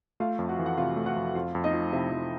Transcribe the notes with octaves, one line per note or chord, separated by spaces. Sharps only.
A3 F4 F5
F2
F#4 F#5
E3
F#5
C3 F4 F5
A3
F#4 F#5
F2
F2 F4 F5
F2
D#4 D#5
F3
C3 E4 E5
F2